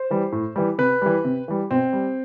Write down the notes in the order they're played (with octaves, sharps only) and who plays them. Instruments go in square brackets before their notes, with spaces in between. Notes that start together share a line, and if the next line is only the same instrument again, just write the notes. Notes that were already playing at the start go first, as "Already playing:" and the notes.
Already playing: [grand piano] C5
E3 G3
A2
E3 G3
C3 B4
E3 G3
C3
E3 G3
B2 C4
G3